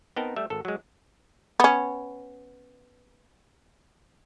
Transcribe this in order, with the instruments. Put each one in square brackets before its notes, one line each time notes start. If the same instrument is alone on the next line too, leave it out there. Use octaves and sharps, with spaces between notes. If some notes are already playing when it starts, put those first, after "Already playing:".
[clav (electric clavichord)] B3 C4 D#4 A#4 G5 A5
G3 A3 E5
G#1 A4
F#3 G#3
[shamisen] B3 C#4